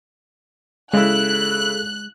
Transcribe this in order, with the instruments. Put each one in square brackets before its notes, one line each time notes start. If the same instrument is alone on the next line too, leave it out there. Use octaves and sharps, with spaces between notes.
[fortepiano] C#3 E4 [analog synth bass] G#3 [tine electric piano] G#4 A4 [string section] F#6